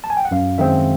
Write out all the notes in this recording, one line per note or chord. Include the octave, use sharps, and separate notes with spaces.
A5
G#5
G5
F#5
F#2 F5
D#3 G#3 C4 E5